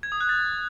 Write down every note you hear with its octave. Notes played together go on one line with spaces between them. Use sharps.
G#6
D#6
F#6
A6